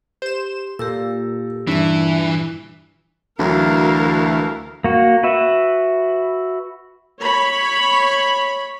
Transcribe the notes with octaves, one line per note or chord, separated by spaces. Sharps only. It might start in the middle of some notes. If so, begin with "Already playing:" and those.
G4 C5 E7
A#2 G4 A4 A#4 E6
G2 E3 E4 E5
D2 E3 F#3 A3 A#4 F5
A#3 F#4
F#4 B4 E5
C#5 B5